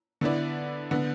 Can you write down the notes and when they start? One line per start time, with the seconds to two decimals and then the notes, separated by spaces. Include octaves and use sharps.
0.21 D3 B3 E4 B4 D5
0.91 D3 B3